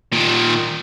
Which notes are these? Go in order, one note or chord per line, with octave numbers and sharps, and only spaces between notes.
A#2 D#3